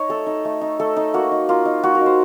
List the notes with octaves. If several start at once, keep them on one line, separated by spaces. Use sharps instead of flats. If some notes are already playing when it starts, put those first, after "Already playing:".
Already playing: D#4 C#5 D#5
A3 A4
D#4
A3
D#4
A3 A4
D#4
A#3 F#4
D#4
A#3 F4
D#4
A#3 F#4
A#4
D#4
C5